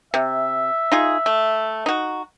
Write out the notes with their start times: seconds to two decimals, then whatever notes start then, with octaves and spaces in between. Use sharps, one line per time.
0.14 C3 E5
0.92 D#4 F4 G#4
1.26 A3
1.86 D#4 F#4